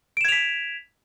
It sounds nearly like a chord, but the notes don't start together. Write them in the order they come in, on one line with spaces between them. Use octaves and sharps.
D7 E7 G#6 F7 B6